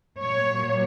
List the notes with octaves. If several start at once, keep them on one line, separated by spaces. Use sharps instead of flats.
A#2 F#3 A#3 C#5